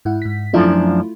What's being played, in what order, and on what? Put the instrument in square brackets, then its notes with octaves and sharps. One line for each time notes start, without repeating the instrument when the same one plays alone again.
[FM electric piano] G#2 E4 F#5
G#2 B6
[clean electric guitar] F#2 F3 D4 [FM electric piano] A3 E4 F4